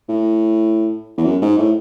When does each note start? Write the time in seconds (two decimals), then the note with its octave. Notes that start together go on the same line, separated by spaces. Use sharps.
0.09 A2
1.17 E2
1.25 F#2
1.42 G#2
1.58 A2